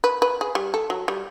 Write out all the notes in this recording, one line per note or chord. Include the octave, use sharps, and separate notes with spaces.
B4
B4
G#4
G3
A4
F#3
G3